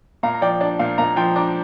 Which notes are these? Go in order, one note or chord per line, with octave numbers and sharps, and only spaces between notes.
A#2 F5 A#5
A#5
F3 D5 G5
D4 D5
A#2 F5
A#2 F5 A#5
F3 G5 C6
D4 A#5 D6